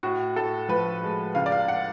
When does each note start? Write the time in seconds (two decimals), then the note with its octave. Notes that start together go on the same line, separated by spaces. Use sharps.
0.03 A2 F#4
0.36 A2 A4
0.69 F3 B4
1.02 G#3
1.35 C#2 F5
1.46 D5
1.52 F5
1.68 F#5